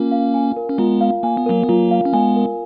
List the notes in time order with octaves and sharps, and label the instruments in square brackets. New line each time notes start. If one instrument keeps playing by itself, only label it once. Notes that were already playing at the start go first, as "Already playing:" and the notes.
Already playing: [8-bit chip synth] A#3 C#4 [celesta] F4 A#4
[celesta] F5
G#5
A#4
[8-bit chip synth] C#4
[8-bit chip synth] G#3 B3 [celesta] F4
[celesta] F5
[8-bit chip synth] A#3 [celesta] G#5
[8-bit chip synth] B3
[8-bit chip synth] F#3 A#3 [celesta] A#4
[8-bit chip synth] B3
[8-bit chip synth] F#3 A#3 [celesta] F4
[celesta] F5
[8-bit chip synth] C#4
[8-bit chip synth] G#3 B3 [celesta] G#5
[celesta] A#4